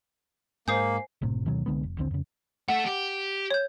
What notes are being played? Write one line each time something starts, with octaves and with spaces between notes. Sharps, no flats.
G#2 A#3 C5 G#5 D#6 G6 C7
F#1 A2 C3
D2 B2 D#3 F#3
C2 D3 G#3 B3
F1
A#1 D#2 D3 C4
F2 C#3
A3 A4 F#5
G4
C#5 G6